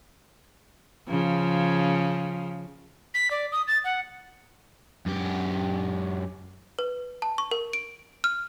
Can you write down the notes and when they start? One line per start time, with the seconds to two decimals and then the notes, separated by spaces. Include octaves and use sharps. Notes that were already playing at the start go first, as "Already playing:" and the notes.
1.09 C#3 F3
3.14 B6
3.31 D5
3.52 D#6
3.68 A6
3.84 F#5
5.06 F#2 G4
6.79 B4
7.22 A5
7.38 C#6
7.51 A#4
7.73 D7
8.24 F6